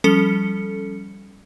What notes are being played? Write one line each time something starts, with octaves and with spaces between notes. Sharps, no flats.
F3 G3 C#4 A4 C#7